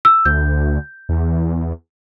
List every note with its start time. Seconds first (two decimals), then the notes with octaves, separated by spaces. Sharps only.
0.05 E6
0.25 D2 G6
1.09 E2